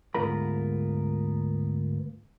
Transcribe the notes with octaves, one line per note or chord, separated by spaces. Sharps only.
D2 G#2 B3 F4 A#4 B5